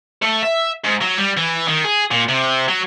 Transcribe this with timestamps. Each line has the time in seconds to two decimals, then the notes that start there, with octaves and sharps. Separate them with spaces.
0.22 A3
0.42 E5
0.85 G#2
1.02 F#3
1.18 G3
1.37 E3
1.68 D#3
1.84 G#4
2.11 A#2
2.29 C3
2.68 F#3